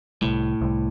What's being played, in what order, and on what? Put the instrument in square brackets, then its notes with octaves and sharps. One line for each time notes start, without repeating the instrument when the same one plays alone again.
[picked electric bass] C2 C3 G3 [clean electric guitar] A2
[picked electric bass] C2 C3 G3